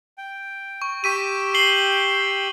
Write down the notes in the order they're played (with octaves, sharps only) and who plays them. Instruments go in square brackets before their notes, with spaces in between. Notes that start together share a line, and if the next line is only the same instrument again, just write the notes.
[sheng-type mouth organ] G5
[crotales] C#6
[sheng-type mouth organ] G4 G5 E6 [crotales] C#6 B6 D#7
[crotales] C7 F#7 G7